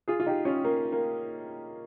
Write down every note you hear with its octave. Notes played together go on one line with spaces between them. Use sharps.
F4 G#4
F4
D#4 G4
C#4 F4
A#3
A#3